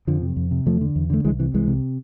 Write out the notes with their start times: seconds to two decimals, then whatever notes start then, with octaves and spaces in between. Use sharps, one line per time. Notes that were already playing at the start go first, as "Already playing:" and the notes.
0.07 F2 D3 F3
0.22 C3
0.36 F2
0.51 C3
0.66 E2 F3 A3
0.81 D3
0.96 E2
1.10 D3 A3
1.25 C2 E3 G#3
1.39 C3 E3
1.54 C2 E3 G#3
1.68 C3